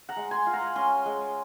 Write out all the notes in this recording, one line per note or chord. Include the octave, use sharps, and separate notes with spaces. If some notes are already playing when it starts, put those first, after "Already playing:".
F#5 A#5
G#3
G#5 C6
F4
F#5 A#5
C#4 G#5 C6
G#3